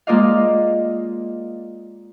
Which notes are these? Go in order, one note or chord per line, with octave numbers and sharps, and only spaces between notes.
G#3 A#3 F4 D5 D#5 F5